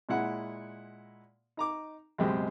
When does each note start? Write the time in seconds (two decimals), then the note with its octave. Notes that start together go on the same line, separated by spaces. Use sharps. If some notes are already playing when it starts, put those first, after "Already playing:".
0.09 A#2 G#3 E4 F#5
1.57 D#4 A#5 D6
2.18 C#2 F#2 B2 G#3 C4 G4